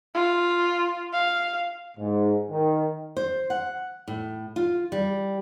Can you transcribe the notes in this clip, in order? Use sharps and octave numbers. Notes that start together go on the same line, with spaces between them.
F4
F5
G#2
D#3
C5
F#5
A2
F4
G3